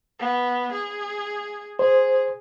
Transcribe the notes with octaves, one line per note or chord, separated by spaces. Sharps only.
B3
G#4
G#4 C5